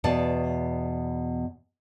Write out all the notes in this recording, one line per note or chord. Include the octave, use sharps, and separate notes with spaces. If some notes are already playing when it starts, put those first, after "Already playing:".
E2 B2 D5 A5